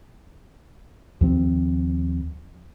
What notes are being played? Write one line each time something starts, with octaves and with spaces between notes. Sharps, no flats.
D#2 F3 C4